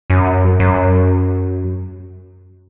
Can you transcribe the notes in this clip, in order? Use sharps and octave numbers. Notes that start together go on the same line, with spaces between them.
F#2
F#2